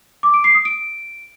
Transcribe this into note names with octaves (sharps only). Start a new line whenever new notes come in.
D6
D7
C7
D#6
D7